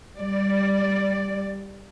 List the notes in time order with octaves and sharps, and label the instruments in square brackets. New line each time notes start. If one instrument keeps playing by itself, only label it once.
[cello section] G3 D5